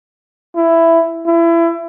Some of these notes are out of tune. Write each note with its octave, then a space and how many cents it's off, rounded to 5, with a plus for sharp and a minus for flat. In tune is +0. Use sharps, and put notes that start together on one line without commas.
E4 +10
E4 +25